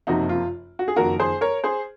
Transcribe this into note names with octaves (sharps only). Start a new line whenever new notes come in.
F#1 F2 C3 F3 A#3 D#4 F#4
F4
F#4
G#4
F#1 F2 D#3 A#3 F#4 A#4
G#4 C5
A#4 C#5
G#4 C5